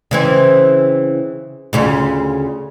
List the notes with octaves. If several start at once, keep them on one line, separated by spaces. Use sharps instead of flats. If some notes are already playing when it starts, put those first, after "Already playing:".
C#3 E3 C4
D2 C#3 F4